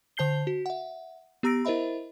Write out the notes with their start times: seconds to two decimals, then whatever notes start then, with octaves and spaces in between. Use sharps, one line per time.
0.17 D3 C5 A5 G6 C7 G7
0.47 F#4
0.66 E5 F#5
1.43 B3 G4 A#5 E6 A#6 D7
1.65 E4 A#4 C5 D#5 E5 B5